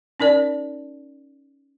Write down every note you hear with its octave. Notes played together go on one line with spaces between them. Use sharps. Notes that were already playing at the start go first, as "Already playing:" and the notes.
C#4 D#4 A#4 D5